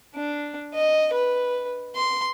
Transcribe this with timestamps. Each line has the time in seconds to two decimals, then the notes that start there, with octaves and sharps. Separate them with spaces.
0.15 D4
0.74 D#5
1.13 B4
1.96 C6